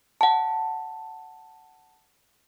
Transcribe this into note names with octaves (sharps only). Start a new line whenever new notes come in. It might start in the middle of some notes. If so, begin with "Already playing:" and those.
F#5 A5